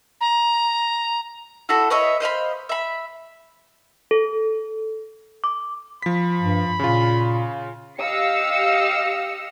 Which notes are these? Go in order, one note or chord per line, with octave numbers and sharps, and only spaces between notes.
A#5
E4 F#4 A4
B4 C#5 D#5 E5
C5 D#5 F5 B5
E5 B5
A4
D6
F3 B5 B6
G2
A#2 C#3 F4
G4 D#5 F5 E6 C#7